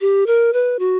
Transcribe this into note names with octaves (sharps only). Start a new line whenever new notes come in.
G4
A#4
B4
F#4